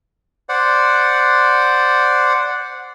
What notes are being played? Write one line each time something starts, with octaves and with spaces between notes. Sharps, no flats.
C5 D5 F#5